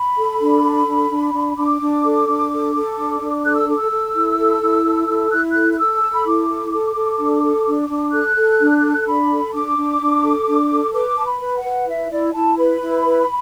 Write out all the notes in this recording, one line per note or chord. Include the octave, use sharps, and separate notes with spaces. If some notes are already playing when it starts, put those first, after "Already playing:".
Already playing: B5
A4
D4
A4
D4
D4
D4
D4 D6
D4
A4
D4
A4
A4
D4
D4
A4 F#6
E6
A4 D6
E6
A4
E4
A4
E4
A4
E4
E4 F#6
A4 F#6
F#6
A4 E6
A4 A5
B5
E4 D6
A4
A4
A4
D4
A4
D4
D4
A4 F#6
A4
D4
A4
D4 B5
A4
D4 D6
D4
D4
A4
D4
A4
B4 D6
B4 A5
B5
B4
F#5
B4
E4 E5
E4 D5
E4 A5
B4 B5
E4
B4